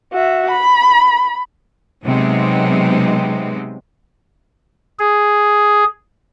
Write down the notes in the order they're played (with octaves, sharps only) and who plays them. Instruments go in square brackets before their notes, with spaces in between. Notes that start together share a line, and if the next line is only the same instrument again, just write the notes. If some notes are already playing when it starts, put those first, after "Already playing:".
[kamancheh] F#4 E5
B5
[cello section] C3 F#3 G#3 B3 C4 D#4
[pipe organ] G#4